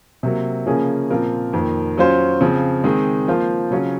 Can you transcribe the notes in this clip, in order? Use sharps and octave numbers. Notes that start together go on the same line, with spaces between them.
C3 F#3 A#3
C#3 F3 A#3 C#4 G#4
A#2 F3 C4 F4 A#4
F2 D#3 A#3
F#3 C#4 F4 C5
C#3 F3 C4
D#3 G#3 C4
F3 A#3 F4 C5
C#3 F#3 C#4 F4